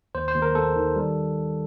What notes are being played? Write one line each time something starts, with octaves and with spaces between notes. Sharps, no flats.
D#2 C5
C5
D#2
A#4
A#3 A4
D#3
G3